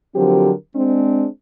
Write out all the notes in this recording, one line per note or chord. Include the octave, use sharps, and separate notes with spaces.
D3 F3 F#3 C4 G4 A#4
G#3 C4 D4